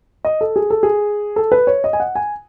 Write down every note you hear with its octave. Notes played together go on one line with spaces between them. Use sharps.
D#5
A4
G#4
A4
G#4
A4
B4
C#5
D#5
G#5
F#5
G#5